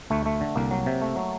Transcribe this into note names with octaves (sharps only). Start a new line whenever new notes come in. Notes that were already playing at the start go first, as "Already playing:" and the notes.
D2 A3
A3
D3
C2 A#3
F#3
C3
A3
F#3